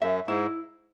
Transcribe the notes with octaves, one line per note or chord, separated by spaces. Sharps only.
F#2 E5
G#2 E4